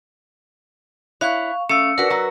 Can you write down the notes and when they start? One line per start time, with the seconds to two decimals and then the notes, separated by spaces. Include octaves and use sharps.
1.21 E4 C#5 F5 C#6 F#6
1.69 A3 C#4 F5 E6 C#7
1.98 D4 F#4 A#4 B4
2.10 F#3 F#4